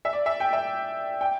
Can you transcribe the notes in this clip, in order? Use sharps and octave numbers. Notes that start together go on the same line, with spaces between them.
E5
D5
E5
G5
E5
G5